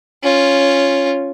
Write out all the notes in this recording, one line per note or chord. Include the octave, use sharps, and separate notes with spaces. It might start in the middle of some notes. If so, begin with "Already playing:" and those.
C#4 F4